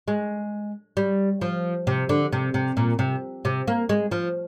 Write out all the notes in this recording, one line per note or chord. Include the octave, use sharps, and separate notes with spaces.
G#3
G3
F3
C3
D3
C3
C3
A#2
C3
C3
A#3
G#3
F3